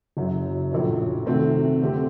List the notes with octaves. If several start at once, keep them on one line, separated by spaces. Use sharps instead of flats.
F#1 F#2 F#3
A#1 A2 F#3
C3 D#3 A3 C4 F#4
D3 A3 C4 G4